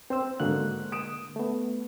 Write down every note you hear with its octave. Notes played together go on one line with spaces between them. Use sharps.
C4 C5 E6
G#2 D3 A#3 F#4 F#6
D#6 D7 E7
A3 B3